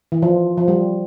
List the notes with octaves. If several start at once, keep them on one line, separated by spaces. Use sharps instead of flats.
E3
F3
F3
G3